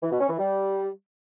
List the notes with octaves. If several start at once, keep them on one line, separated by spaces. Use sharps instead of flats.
E3
B2
C#4
E3
G3